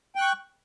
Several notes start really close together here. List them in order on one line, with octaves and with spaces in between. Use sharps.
G5 F#6 C#6